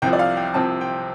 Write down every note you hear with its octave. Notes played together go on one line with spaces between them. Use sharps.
C2 C3 F3 G5
D5
F5
G5
C2 C3 F3 C4 A5
G5